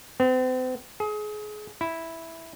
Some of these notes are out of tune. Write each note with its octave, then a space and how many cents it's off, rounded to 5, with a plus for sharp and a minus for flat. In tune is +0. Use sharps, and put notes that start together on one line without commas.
C4 -40
G#4 +30
E4 -5